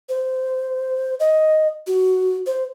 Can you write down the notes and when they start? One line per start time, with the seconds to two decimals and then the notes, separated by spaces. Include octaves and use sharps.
0.09 C5
1.20 D#5
1.87 F#4
2.46 C5